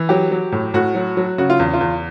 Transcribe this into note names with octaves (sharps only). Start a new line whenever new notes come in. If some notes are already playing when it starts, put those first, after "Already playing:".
Already playing: E3
F#3 G4
F#3
A2
A2 F#4
F#3
F#3
C#3 F#4
F4
E2
F4
E2